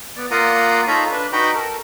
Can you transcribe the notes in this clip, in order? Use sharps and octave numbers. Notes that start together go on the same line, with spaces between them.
B3 D5
A#3 F4 D5 F#5 A#5 D#6
D#4 F4 A4 C#5 A#5 B5
D4 B4
D#4 F#4 B4 G5 A#5 B5
A4 A#4